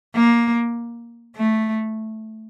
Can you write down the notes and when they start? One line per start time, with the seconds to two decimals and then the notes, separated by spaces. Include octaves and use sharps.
0.15 A#3
1.36 A3